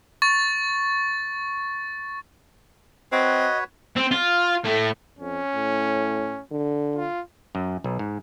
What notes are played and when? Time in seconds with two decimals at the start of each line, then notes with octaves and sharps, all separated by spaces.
0.22 C#6 A6
3.12 C4 F#4 B4 C#5 D#5
3.96 C4
4.11 F4
4.64 A2 A3
5.19 F2 C#4
5.54 A2
6.51 D3
6.96 F4
7.55 F#2
7.84 B1
7.99 G#2